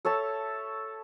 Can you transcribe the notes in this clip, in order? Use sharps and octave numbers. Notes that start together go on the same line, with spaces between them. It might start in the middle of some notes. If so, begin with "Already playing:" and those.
A4 C#5 E5 A5